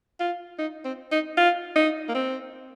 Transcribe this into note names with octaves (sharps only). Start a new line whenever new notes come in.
F4
D#4
C4
D#4
F4
D#4
A#3
C4